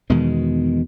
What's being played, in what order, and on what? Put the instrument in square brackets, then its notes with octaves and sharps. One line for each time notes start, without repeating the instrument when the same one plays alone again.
[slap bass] E2 B2 D#3 G#3